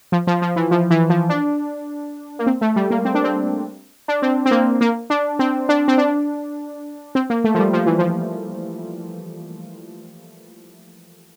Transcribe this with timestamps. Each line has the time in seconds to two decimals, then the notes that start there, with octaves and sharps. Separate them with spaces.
0.12 F3
0.27 F3
0.42 F3
0.56 E3
0.71 F3
0.90 E3
1.10 F3
1.29 D4
2.39 A#3
2.47 C4
2.61 A3
2.76 G3
2.91 A#3
3.05 C4
3.15 D4
3.24 C4
4.08 D4
4.22 C4
4.46 C4
4.51 A#3
4.81 A#3
5.10 D4
5.39 C4
5.69 D4
5.88 C4
5.98 D4
7.15 C4
7.30 A#3
7.44 A3
7.54 F3
7.59 G3
7.73 F3
7.86 E3
7.99 F3